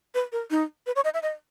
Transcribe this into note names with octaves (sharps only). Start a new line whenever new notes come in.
B4
A#4
D#4
B4
C#5
D#5
E5
D#5